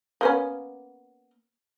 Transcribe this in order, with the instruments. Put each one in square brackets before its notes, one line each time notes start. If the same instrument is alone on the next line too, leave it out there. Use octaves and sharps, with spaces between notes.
[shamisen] A#3 B3 C#4